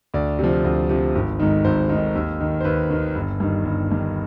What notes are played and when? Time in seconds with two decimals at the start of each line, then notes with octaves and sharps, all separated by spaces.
0.14 D2 D5
0.39 C3 F3
0.64 D2
0.89 C3 F3
1.15 G#1
1.40 G#2 D#3
1.65 G#1 C5
1.89 D#3
1.95 G#2
2.15 D#2
2.41 D#3
2.60 C5
2.64 D#2 B4
2.90 D#3
3.15 G1
3.40 G2 D#3
3.65 G1
3.90 G2 D#3